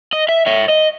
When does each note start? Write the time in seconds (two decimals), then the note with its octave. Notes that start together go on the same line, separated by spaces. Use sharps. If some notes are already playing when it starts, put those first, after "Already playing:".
0.13 D#5
0.29 E5
0.46 C#5 E5
0.68 D#5